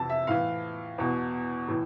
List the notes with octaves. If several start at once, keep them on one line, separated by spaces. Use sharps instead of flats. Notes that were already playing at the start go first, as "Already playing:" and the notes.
Already playing: F2 C3 E3 A5
E5
A2 E3 F5
E2 B2
A2 E3